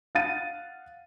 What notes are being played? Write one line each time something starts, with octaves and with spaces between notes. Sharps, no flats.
F5 F#5 A6 D#7